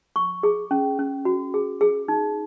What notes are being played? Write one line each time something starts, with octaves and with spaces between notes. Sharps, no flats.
C#6
G#4
C#4
C#4
F#4
G#4
G#4
D#4